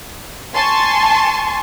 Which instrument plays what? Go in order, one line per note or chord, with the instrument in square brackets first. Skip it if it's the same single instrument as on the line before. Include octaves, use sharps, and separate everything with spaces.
[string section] G#5 A5 C6 C#6